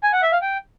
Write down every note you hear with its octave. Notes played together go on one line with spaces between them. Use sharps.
G#5
F#5
E5
F5
G5